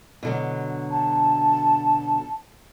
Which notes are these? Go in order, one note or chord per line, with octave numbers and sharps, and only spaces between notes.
B2 D3 F#3
A5